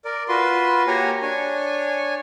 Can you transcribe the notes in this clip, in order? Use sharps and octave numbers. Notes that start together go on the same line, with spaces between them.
A#4 D5
F4 F#4 B4 C6
A#3 F#4 G4 C#5 G#5 A#5
D4 C#5 G#5